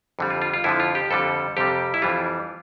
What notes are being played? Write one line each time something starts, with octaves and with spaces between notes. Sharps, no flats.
F2 D3 G3
F4
F4
F4
F2 D3 F3 E4
F4
G4
F2 D3 G3 A4
F2 C3 G3 G4
E4
F2 E3 G3 F4